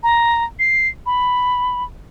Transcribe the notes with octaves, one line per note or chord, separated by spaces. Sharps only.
A#5
C7
B5